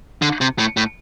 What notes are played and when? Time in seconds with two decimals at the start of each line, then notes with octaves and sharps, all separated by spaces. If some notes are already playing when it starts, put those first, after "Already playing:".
0.22 D3
0.41 C3
0.59 A2
0.77 A2